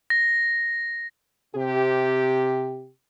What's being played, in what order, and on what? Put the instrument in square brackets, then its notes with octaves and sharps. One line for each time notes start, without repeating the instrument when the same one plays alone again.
[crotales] A#6
[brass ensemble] C3 G4